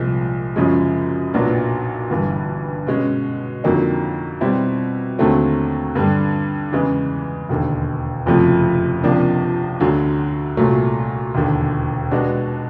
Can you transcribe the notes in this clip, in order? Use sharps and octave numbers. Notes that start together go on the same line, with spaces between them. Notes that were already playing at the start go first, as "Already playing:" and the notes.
Already playing: C2 A#2 F3 G#3
F#2 C#3 F3 G#3 C#4
B1 A#2 F#3 B3 D4
G1 G2 E3
B2 G#3 C#4
F2 D3 F#3 A#3 D#4
B2 G3 C4 E4
D#2 D3 F#3 A3 C4
G2 D3 G3
E2 C#3 E3 G#3
E1 D#2 D3
F#1 F2 C3 F3 A3
C#2 C3 F3 A#3 D4
D2 D3 F#3
C2 A#2 F#3 A3
E1 D#2 D3
B2 G#3 B3 D4 F#4